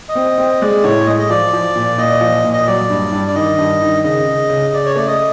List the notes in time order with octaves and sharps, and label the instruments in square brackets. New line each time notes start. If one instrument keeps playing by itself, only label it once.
[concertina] D#5
[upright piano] C4
C4
[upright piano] G#3 [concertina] D5
[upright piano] A2 [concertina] C#5
[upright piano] G#3 [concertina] D#5
[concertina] D#5
[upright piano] F3 [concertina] D5
[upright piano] F3
A#2
[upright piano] A#2 [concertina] D#5
[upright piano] F3
A#2
[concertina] D#5
[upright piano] F#3 [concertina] D5
[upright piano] G2
G2
[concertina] D5
[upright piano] D#3 [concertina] D#5
[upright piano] G2
D#3
[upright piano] C#3 [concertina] D#5
[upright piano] C#3
C#3
[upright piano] C#3 [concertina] D5
[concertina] C#5
[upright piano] A3 [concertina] D5
[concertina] D#5